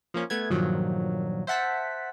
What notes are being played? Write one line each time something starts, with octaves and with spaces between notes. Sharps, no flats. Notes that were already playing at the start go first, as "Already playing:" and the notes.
F3 A#3 C#4
A3 B3 G#6
G2 A#2 D#3 F3 F#3
C5 E5 F#5 A5 B6